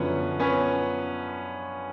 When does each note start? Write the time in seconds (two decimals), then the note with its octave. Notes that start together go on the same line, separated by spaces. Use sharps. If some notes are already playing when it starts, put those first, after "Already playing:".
Already playing: F#2 D3 F3 B3 C#4
0.39 B3 C#4